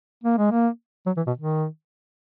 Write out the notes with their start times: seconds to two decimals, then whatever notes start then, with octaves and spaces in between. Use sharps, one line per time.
0.24 A#3
0.37 G#3
0.51 A#3
1.06 F#3
1.17 E3
1.27 B2
1.38 D#3